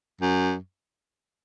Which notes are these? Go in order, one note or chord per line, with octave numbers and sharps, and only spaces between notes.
F#2